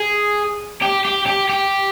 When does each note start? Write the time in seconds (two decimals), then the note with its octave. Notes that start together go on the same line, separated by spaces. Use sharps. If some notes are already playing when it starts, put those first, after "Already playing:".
Already playing: G#4
0.82 G4
1.05 G4
1.26 G4
1.49 G4